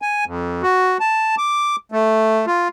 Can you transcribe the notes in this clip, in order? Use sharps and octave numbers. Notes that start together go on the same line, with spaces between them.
G#5
F2
F#4
A5
D6
A3
F4